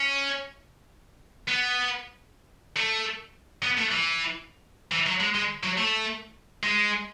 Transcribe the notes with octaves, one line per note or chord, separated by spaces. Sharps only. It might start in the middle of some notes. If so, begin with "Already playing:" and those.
Already playing: C#4
B3
A3
B3
A3
E3
E3
F#3
G#3
G#3
F#3
A3
G#3